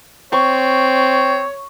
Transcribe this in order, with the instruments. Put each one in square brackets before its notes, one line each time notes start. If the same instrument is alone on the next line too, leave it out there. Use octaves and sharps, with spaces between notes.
[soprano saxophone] C4 [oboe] C#5 [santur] C#6